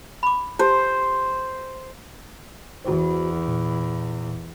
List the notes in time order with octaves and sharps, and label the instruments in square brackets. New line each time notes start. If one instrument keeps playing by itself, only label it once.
[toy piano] B5 D6
[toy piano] G4 A5 [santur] C5
[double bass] E2 [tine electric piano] F#4 C5
[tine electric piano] A#2